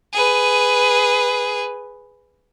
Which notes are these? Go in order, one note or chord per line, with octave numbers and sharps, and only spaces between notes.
G#4 B4